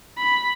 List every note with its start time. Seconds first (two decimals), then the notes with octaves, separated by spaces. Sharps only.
0.18 B5